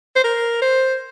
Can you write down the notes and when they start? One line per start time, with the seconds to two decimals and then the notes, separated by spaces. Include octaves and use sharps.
0.16 C5
0.24 A#4
0.62 C5